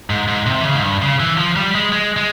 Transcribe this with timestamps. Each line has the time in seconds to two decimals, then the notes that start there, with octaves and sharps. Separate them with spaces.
0.10 G#2
0.28 G#2
0.46 C3
0.60 E3
0.65 C#3
0.74 G#2
0.83 G2
1.02 C#3
1.20 E3
1.38 F3
1.56 G3
1.75 G#3
1.92 G#3
2.17 G#3